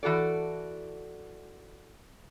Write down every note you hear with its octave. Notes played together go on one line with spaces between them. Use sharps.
E3 F#4 A4 D5